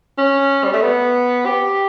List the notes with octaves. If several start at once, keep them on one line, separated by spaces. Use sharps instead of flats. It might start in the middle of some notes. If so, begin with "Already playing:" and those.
C#4
G3
A3
B3
G4